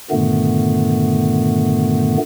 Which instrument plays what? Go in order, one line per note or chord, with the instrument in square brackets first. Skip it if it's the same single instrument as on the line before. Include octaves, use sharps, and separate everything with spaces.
[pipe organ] G2 A#2 D3 D#3 A3 B3